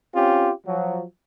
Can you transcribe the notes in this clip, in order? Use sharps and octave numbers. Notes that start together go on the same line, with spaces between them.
C4 C#4 F4 G4
F3 F#3